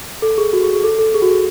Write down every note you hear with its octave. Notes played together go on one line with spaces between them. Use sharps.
A4
G#4
F#4
G#4
G#4
A4
A4
G#4
F#4
G#4